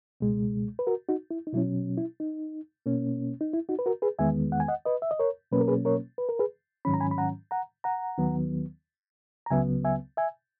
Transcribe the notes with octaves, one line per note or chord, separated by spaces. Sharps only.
C#2 B2 G#3
B4
F#4 A#4
D#4 F#4
E4
D#4
B2 F#3 C#4 E4
E4
D#4
B2 A#3 C#4
D#4
E4
D#4 F#4
B4
F#4 A#4
G#4 B4
E2 D#3 G#3 B3 E5 G#5
F#5
G#5
D#5 F#5
B4 D#5
E5
D#5
A#4 C#5
B2 F#3 A#3 C#4 B4
A#4
G#4 B4
A#4 C#5
B4
A#4
G#4 B4
G#2 D#3 F#3 C#4 B5
A#5
G#5 B5
B5
F#5 A#5
F#5 A#5
F#5 A#5
D#2 D#3 F#3 B3
A#5
C#2 C#3 F#3 B3 E5 G#5
E5 G#5
E5 G#5